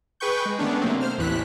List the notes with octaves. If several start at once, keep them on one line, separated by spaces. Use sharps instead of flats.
G#4 B4 G5 C#6 G6
G#3
D#3 A3 B3 C#4 D4
C3 F#3 A3 A#3 C4
C5 F6
A1 D#2 A2 E3 F#6 B6